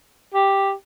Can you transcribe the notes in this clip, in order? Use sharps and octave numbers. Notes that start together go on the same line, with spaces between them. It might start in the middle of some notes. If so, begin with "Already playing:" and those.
G4